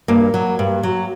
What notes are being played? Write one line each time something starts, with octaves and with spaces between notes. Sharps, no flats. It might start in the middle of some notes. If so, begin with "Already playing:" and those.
G2 A#3
F#3
G2
F#3